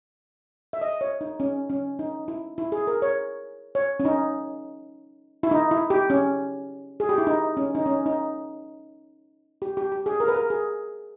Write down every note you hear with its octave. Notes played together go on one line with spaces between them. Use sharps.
E5
D#5
C#5
D#4
C#4
C#4
D#4
E4
E4
G#4
A#4
C#5
C#5
C#4
D#4
E4
D#4
E4
G4
C#4
G#4
G4
E4
D#4
C#4
D#4
C#4
D#4
G4
G4
G4
G#4
A#4
B4
A#4
G#4